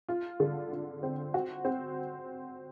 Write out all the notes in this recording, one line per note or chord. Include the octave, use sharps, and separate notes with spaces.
F4
D3
F4
C4
F#4
C4